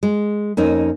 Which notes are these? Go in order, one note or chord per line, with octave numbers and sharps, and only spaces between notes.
G#3
F2 A#3 C#4 D#4